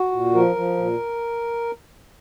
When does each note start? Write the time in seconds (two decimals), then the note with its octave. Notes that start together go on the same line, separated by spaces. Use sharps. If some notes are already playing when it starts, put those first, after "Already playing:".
Already playing: F#4
0.12 A#2
0.34 F3 A#4
0.56 F3
0.77 A#2